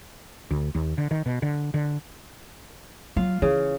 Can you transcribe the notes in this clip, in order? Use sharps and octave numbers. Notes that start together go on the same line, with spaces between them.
D2
D#2
D3
D#3
B2
D3
D3
F#3 F4 F5
C#3 E3